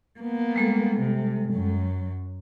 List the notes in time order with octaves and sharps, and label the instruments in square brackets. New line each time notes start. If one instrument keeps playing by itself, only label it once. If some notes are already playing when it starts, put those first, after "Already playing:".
[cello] A#3 B3
[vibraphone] G3 G#3 A4
[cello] C3
F#2 F#3